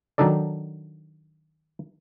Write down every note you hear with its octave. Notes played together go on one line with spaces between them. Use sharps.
D#3 F#3 D4 D#4 A4 D5